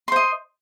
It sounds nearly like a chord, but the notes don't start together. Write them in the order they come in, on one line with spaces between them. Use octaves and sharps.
C6 C5 D#5